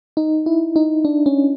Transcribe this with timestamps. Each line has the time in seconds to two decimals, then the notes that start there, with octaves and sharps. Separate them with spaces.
0.17 D#4
0.46 E4
0.76 D#4
1.05 D4
1.26 C#4